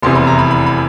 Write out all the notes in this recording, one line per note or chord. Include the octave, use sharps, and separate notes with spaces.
F1 E2 C3 E3 C6
B5
A#5
B5
B5
B5